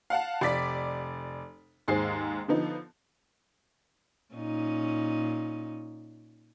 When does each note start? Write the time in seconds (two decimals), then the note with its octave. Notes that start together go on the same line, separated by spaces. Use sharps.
0.10 F5 F#5 A5
0.41 F1 D5 B6
1.88 D#2 G#2 G#4 C5 C7
2.48 D3 F3 B3 D#4
4.34 A#2 C#4 D#4